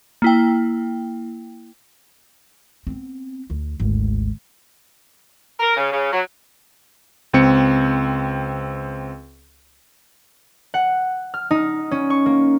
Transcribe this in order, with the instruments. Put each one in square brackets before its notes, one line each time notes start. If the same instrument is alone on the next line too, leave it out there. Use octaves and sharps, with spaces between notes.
[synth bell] A#3 E4 G5
[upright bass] B3 C4
D2
G#1 D2
[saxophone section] A#4
C#3
C#3
F#3
[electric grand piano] C#2 C4 C#7
[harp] F#5
F6
D#4
C#4
C#6
A#3